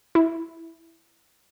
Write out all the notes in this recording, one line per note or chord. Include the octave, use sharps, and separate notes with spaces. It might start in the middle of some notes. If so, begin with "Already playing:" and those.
E4